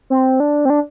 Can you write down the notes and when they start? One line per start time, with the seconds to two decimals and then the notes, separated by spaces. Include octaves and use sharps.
0.10 C4
0.40 D4
0.65 C4
0.70 D4